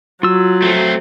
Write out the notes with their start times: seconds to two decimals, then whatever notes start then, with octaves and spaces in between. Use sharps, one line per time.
0.23 F#3 F4 E6
0.62 A3 C4